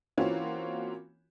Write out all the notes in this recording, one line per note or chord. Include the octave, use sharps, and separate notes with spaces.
E3 A#3 C4 C#4 F4 F#4